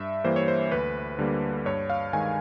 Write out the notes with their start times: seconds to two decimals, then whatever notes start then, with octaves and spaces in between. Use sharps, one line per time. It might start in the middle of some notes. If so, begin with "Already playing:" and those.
Already playing: G2 E5
0.24 E3 G3 A#3 C5
0.36 C#5
0.48 C5
0.72 D2 B4
1.19 D3 G3 A#3
1.66 G2 C#5
1.90 F5
2.13 D#3 G#3 G#5